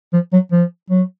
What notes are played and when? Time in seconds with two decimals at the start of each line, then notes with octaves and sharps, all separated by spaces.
0.13 F3
0.33 F#3
0.52 F3
0.90 F#3